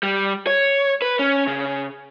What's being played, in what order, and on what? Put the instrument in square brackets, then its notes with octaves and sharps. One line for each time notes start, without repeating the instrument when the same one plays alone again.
[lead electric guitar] G3
C#5
B4
C#4
C#3